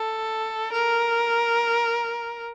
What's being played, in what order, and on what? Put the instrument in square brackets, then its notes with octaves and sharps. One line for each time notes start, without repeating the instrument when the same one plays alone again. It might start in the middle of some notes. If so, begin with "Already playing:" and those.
Already playing: [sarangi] A4
A#4